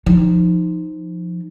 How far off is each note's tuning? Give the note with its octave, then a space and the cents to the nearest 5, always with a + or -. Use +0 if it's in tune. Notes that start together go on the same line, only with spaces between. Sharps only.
F3 +0 D#4 +0